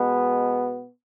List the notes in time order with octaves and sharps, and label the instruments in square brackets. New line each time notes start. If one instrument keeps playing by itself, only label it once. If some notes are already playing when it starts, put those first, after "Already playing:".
Already playing: [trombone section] B2 G#3 B3